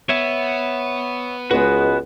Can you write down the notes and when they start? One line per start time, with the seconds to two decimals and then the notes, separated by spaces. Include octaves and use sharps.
0.09 B3 C#5 E5
1.51 C#2 G#3 B3 F#4 B4